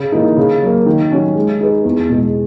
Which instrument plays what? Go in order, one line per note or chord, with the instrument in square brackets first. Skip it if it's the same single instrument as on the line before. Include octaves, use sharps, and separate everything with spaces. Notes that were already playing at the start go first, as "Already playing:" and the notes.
Already playing: [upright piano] C#3
E3 A#3 D#4
C#3
F#3 A#3
D#3
F#3 C#4 F#4
G#3
D#4 G#4 B4
E2
B2 G#3